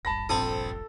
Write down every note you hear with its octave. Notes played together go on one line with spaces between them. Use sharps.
D#1 G#1 G2 A5 B5 A#6
A#1 C4 A4 B5 D#6